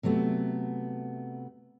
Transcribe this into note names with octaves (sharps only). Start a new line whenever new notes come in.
C3 F#3 A3 B3